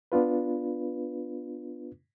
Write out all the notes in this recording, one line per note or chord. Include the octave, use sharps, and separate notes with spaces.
B3 D4 F4 B4